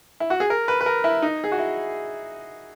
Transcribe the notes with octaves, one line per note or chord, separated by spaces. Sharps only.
E4
F#4
G#4
A#4
B4
B4
A#4
E4
D#4
G#4
F#4
E4